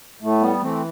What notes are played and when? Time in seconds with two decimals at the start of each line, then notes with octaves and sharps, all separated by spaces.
0.21 A2 A3
0.41 G3 B3
0.61 E3 A3 C4